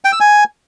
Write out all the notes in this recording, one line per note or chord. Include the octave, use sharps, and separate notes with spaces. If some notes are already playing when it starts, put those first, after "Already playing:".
G5
E6
G#5